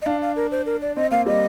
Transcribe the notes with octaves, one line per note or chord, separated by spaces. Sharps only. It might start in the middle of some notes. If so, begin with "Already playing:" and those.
D#5
D4 F5
F5
A#4
C5
A#4
D5
C4 D#5
A#3 F5
G3 D#5